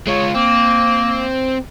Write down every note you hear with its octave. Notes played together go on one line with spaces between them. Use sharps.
G#3 F4 C#5
A#3 C4